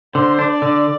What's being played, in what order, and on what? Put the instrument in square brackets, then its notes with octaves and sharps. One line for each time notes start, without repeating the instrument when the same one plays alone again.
[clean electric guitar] D3 [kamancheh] C5
[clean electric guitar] D4
[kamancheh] D5
[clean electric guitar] D3